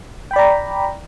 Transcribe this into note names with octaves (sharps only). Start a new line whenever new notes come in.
D5 G5 A#5 B5